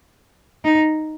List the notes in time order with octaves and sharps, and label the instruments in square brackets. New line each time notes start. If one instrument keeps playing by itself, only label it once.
[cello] D#4